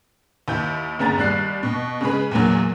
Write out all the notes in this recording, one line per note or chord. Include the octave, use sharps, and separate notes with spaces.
D#2 E4 G6
G1 B3 C#4 G#4 A#5 A6
D#2 G3 F#6 C7
B2
C#3 G#3 G#4 B4
E2 A#2 F#3